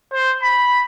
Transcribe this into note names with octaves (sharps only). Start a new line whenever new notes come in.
C5
B5